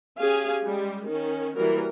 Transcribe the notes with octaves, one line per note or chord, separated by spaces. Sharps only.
C#4 G4 G#4 F5 G#5
G3 G#3
D#3 C#4
E3 F#3 G3 A#3 A#4